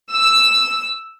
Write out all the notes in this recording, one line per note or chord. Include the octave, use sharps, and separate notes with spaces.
E6